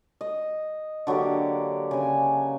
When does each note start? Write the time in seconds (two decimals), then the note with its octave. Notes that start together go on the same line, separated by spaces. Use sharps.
0.21 D#5
1.07 D3 F#3 A#3 G4
1.91 C#3 G#5